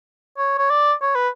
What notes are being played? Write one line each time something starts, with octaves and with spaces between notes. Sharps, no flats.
C#5
C#5
D5
C#5
B4